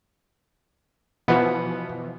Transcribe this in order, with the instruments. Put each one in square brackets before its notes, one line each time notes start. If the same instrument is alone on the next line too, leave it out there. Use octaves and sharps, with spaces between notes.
[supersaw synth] B2 E3 F3 [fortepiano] B3